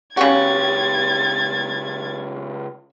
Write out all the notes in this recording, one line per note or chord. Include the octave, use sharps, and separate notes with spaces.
C#2 C#3 F#4 G4 G#6 A6